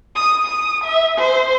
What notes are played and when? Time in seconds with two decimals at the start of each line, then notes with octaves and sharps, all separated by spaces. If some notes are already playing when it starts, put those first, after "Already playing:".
0.15 D#6
0.47 D#6
0.84 E5
1.18 C5